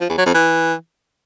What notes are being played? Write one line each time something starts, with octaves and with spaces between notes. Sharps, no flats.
F3
E2
F#3
F2
E3